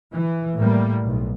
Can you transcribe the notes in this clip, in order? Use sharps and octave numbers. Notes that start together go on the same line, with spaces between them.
E3
A2 G3 A#3
B1